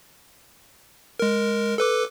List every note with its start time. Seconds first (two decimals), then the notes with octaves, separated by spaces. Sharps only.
1.20 G#3 A#4
1.78 A4 B4 D6